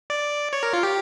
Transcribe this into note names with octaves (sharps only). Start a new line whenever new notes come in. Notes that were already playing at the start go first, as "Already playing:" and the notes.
D5
C#5
A#4
F4
G4